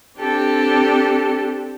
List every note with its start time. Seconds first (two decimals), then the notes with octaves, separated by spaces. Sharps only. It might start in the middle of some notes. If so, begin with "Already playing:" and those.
0.19 C4 D4 G4 A4